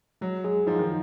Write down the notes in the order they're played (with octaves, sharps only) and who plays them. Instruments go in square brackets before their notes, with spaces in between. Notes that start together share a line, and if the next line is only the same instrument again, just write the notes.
[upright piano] F#3 [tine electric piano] G#3
[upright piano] F#3 [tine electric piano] G#4
[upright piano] F3 [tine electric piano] D#4
[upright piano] D#3